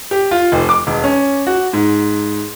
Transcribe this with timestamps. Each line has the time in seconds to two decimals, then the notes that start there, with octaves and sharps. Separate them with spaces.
0.11 G4
0.31 F4
0.52 F1
0.69 D6
0.87 E1
1.04 C#4
1.47 F#4
1.73 G#2